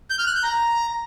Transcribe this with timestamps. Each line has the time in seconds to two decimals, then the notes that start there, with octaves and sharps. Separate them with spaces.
0.10 G6
0.18 F6
0.27 F#6
0.35 G6
0.43 A#5